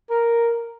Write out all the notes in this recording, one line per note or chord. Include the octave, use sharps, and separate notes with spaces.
A#4